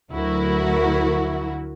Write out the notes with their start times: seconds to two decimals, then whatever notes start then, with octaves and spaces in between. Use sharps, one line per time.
0.11 D2 F#3 E4 F#4 A#4